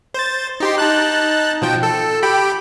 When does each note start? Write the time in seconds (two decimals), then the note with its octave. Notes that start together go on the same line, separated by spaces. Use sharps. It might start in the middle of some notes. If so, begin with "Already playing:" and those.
0.14 C5 A6
0.60 D#4 G4 C6
0.78 D#4 A5 F#6
1.62 B2 F3 G5
1.83 A4
2.23 G4 G5 B5